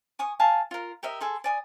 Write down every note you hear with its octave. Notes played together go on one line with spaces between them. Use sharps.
G#5 C#6 D#6
F5 G#5 A5
F4 A#4
G4 A#4 D#5 E5
G#4 A4 C6
D5 G#5 D#6